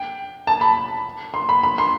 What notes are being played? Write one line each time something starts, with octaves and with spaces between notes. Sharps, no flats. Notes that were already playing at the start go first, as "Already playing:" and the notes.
Already playing: G5
A5
B5
C6
B5
B5
C6